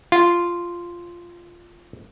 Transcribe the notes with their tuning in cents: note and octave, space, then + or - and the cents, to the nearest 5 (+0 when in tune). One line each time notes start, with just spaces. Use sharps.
F4 -5